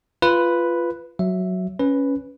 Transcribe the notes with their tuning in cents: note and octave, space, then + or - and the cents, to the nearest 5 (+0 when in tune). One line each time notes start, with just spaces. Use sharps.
F4 -15 B4 +0
F#3 +0 E5 +0
C#4 +0 B4 +0